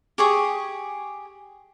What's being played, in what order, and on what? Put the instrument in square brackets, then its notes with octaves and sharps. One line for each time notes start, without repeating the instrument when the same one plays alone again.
[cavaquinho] G4 G#4 C#6 D#6